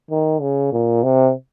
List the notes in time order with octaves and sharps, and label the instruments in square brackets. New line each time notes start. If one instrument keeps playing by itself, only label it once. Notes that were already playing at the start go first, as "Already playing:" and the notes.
[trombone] D#3
C#3
A#2
C3